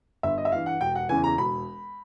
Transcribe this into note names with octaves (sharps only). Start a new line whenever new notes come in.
G1 E5
D#5
E5
G2 E3 F5
F#5
E1 G5
F#5
E2 C#3 E3 G#5
A#5
E1 B5